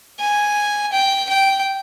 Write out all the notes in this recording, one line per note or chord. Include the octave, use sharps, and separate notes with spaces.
G#5
G5
G5